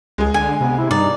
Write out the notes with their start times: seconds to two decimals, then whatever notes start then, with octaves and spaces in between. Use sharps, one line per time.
0.18 C#2 G#3 G#4
0.34 D3 G#5
0.61 C3 B3
0.78 E4
0.91 G2 D#4 D5